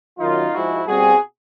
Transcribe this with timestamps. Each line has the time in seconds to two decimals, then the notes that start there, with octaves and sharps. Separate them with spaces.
0.19 F#2 D#3 F#3 D#4 F4
0.52 G#2 F3 G#3 E4 F#4
0.87 B2 G3 C4 F#4 G#4